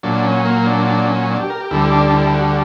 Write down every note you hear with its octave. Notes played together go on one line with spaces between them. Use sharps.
A#2 F#3 D4
C#4
A#3
D4
D4
C#4
D4
G4
A#4
G4
D2 D3 G3 E4
D4
D4
E4
F#4